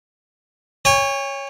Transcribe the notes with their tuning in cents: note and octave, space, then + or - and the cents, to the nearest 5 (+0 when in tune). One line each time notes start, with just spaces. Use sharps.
C#5 +0 G#5 -45